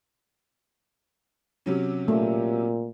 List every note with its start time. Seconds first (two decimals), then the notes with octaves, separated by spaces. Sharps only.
1.66 C3 F#3 C#4
2.08 A#2 A3